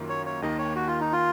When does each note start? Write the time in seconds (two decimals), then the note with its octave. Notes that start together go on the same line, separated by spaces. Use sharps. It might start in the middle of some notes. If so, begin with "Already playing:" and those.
Already playing: F#2 D#3 A#3 F4
0.09 C#5
0.26 C#5
0.42 D#2 D#3 A#3 D#5
0.59 C#5
0.76 F#4
0.88 F4
1.00 D#4
1.12 F4